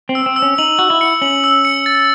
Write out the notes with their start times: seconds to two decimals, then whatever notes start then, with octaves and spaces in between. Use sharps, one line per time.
0.09 C4
0.15 E6
0.26 C4
0.36 E6
0.42 C#4
0.58 D#4 F#7
0.79 F#4 F#7
0.90 E4
1.01 C#7
1.22 C#4 F#7
1.44 E6
1.65 C#7
1.86 A6